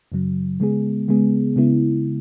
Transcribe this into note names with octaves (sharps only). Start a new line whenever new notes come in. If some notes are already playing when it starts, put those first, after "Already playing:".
F#2 C#3 F#3
C#3 G#3 B3 G#4
C#3 G#3 B3 G#4
C#3 G#3 B3 E4